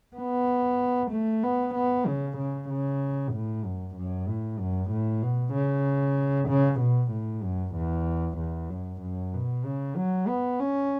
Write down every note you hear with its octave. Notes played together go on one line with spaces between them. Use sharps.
B3
A3
B3
B3
C#3
C#3
C#3
A2
F#2
F#2
A2
F#2
A2
B2
C#3
C#3
B2
A2
F#2
E2
E2
F#2
F#2
B2
C#3
F#3
B3
C#4